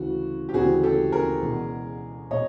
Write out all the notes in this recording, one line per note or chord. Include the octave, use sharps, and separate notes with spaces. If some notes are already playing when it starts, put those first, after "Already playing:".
Already playing: D2 C#3 E3 F#4
G4
D2 C#3 E3 F#4 G#4
G4 A4
G#4 A#4
E2 B2 G#3
B2 G#3 C#5 D#5